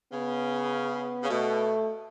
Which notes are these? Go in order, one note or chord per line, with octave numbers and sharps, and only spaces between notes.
C#3 B3
C#3
B2 A3